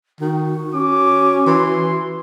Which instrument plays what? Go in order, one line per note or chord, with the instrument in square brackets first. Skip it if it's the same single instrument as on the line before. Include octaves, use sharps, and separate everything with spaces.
[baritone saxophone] D#3 [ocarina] F#4
[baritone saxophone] C#4 [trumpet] D6
[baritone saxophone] E3 [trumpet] C6